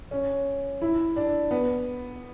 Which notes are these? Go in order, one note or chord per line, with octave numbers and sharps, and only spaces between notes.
C#4
E4
D4
B3